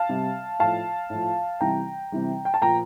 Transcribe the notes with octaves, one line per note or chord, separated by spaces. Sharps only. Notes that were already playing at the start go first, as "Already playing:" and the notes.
Already playing: F5 A5
C3 G3
A2 F3 F5 A5
A2
F3
C3 E3 G3 G5 A#5
C3 E3 G3
G5
A5
A#2 F3 G5 A#5